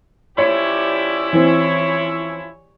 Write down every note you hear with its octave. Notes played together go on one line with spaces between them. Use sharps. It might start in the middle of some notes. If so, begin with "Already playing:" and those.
F3 C#4 E4 G4 C#5 D5
E3 C4 C#5